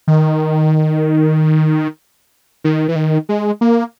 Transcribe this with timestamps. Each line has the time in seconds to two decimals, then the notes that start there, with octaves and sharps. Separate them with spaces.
0.08 D#3
2.64 D#3
2.88 E3
2.96 D#3
3.29 G#3
3.61 A#3